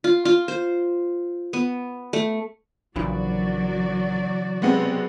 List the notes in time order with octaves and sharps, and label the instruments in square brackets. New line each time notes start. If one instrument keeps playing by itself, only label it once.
[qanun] F4
F4
C5
B3
A3
[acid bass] A#1 [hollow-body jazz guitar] C#3 E3 [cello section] F#3 F#4 D5
[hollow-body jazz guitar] B1 A2 C3 [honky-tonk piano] G#3 B3 C4